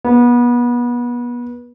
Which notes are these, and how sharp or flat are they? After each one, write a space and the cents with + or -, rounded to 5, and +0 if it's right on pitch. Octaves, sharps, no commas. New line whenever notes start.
B3 -30